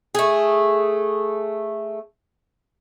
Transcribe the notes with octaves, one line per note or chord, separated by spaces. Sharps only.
A3 G#4